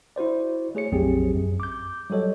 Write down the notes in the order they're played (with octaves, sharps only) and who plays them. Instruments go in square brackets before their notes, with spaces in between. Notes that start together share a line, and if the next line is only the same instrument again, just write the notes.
[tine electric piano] E4 F#4 C5 D5
A3 G#4 C#5 C#7
A#1 F2 F#3 C4 G4 G#4
F#2
D6 G6
F#3 G3 F#4 A4 C#5 D#5